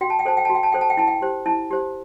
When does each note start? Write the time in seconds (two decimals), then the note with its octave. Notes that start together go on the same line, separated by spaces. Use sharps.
0.01 F#4 G5
0.10 A5
0.19 G5
0.25 A4 C5 A5
0.37 G5
0.45 A5
0.50 F#4
0.55 G5
0.63 A5
0.72 A4 C5 G5
0.81 A5
0.90 G5
0.97 E4 A5
1.07 G5
1.22 G4 C5
1.46 E4 A5
1.71 G4 C5